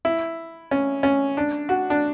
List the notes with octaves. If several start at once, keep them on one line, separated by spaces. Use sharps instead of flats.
E4
C#4
C#4
D4
F#4
D4